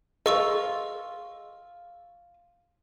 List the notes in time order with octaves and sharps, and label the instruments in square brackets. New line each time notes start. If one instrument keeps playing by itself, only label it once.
[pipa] F4 [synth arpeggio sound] G#4 [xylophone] D#5 C#6 E6